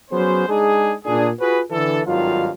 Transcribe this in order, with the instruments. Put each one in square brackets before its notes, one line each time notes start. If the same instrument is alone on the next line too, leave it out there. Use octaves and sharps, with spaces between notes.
[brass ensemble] F#3 B3 C#4 G#4 C5
G#3 D4 D#4 G#4
A#2 D4 G#4
F4 F#4 G#4 B4
D3 E3 A4
G#1 G2 D#3 F#3 F4 F5